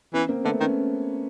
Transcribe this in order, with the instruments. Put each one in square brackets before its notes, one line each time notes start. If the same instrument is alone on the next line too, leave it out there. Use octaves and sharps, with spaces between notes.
[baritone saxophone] E3 [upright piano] B3 C#4
[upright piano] A#3 C4
[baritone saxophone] D3 [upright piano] A3 B3
[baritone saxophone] D#3 [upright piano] B3 C#4